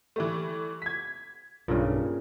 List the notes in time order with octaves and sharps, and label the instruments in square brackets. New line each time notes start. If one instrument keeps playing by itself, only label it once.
[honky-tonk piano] E3 G3 A3
G#6 B6
[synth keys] B1 G2 [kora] A#2 C#3